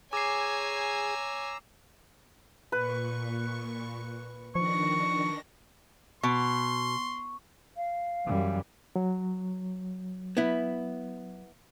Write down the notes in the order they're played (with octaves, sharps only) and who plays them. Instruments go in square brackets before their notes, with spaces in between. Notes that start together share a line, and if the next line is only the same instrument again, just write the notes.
[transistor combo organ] G#4 [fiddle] C#5 G#5 [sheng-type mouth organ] A#5 E6 [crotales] D6 C7
[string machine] A#2 C#6 [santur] B4
[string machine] D#3 D4 A#6 [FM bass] F3 [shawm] C#6
[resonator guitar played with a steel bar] B2 [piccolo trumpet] C6 [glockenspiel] C#6
[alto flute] F5
[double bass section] F#2 E3 G3
[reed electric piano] F#3
[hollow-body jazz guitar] B3 E4